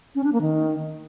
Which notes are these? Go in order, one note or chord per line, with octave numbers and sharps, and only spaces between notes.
C#4
D4
A#3
D#3